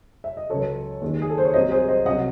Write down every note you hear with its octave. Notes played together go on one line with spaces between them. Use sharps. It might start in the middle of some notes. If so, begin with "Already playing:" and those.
E5
D#5
C#2 C#3 F#3 A4 C#5
D#2 D#3 G#3
G#4
A4
C5
C#5
C2 C3 F#3 C5 D#5
G#4 C5
C5 D#5
C2 C3 F#3 D#5 F#5